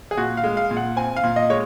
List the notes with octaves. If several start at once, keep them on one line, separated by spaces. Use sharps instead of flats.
G#4
A#2 F#4
F5
G#3
F5
A#2
F#5
C4 G#5
F5
A#2
D#5
G#3 C#5